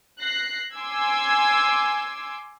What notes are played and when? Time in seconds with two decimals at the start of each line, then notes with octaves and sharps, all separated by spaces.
0.19 F#6 A#6 C7
0.74 G#5 C6 D6 E6 G#6